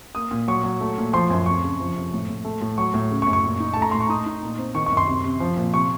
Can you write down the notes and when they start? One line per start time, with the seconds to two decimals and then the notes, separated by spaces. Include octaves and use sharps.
0.15 A#3 D#6
0.31 A#2
0.48 F#3 C#6
0.64 F#3
0.81 A3
0.98 A#2
1.13 F3 C6
1.30 F#2
1.46 F2 C#6
1.63 C#3
1.80 F3
1.97 C3
2.13 A2
2.29 A2
2.45 A3
2.61 A2
2.78 F#3 C#6
2.94 A2
3.11 C#3
3.22 C#6
3.27 F#2
3.33 C#6
3.44 A#2
3.60 D#4
3.74 A3 A5
3.82 A#5
3.91 A2 C6
4.00 C#6
4.09 D#4 D#6
4.26 D#4
4.43 A#2
4.58 C4
4.74 D#3 C#6
4.86 C#6
4.92 F#2
4.97 C6
5.07 C3
5.25 C3
5.40 F3
5.57 A#2
5.74 C3 C#6